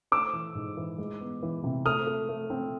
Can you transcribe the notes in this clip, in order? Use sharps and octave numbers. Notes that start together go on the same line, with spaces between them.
A3 D6 E6
E3
G#2
E3
G#3
B3
E3
C3
A3 D#6 F6
A3
A3
C4